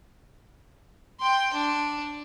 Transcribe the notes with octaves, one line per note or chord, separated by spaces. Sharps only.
G5 C6
D4